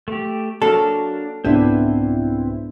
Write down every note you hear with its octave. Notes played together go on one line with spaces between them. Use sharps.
A3 G4
F#3 A#3 D4 A4 F6
C2 G#2 B3 C4 D4 E4 B4 C5